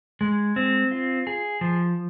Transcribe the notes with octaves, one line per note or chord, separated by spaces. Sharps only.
G#3
C4
F4
G#4
F3